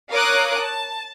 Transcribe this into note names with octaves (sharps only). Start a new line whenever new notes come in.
A#4 C#5 F5 D6 D#6 F#6
A5